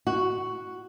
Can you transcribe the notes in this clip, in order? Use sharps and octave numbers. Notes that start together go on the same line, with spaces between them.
F#4